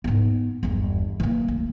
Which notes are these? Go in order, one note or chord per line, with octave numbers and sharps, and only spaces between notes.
G#2 B3
G1 E2
E3 A#3
D2